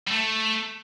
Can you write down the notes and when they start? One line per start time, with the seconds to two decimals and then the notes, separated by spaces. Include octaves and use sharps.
0.07 G3
0.11 A3